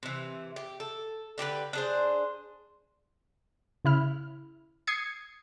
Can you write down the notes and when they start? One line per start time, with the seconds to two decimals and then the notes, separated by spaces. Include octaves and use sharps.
0.03 C3 E3
0.56 G4
0.80 A4
1.38 D3 G4 A4 B4
1.73 D4 G#4 C5
3.85 C#3 E4 F6
4.87 D#6 G#6 C7 C#7